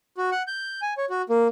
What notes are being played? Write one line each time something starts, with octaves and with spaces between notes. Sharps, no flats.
F#4
F#5
G6
G#5
C#5
F#4
A#3